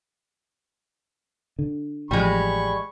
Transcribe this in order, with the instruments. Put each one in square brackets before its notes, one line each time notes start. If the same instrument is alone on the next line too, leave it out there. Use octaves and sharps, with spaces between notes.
[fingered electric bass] D3
[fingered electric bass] A1 F3 [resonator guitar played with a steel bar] G3 G#3 [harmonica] B5 C#6